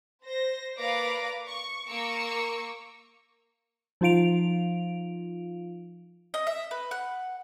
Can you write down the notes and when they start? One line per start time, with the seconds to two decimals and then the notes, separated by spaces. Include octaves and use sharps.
0.22 C5 A#6
0.77 A#3 B4 D5 F5 D6 A#6
1.47 C#6
1.87 A#3 A#5 C#6 D6 E6
4.01 F3 D#4 F4 F5 D7 F7
6.34 D#5
6.47 E5
6.71 B4
6.91 F#5